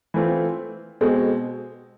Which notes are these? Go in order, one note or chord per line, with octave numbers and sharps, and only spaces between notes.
E3 A3 C4 F4
B2 G#3 C4